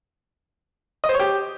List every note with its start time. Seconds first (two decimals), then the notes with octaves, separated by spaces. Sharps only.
1.04 D#5
1.09 C5
1.14 C#5
1.20 G4